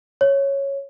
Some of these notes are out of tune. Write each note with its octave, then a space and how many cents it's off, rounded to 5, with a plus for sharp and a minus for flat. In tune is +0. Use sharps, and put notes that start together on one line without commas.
C#5 -5